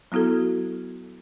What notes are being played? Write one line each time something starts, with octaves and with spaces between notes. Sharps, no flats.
F#3 B3 E4 F#4 A4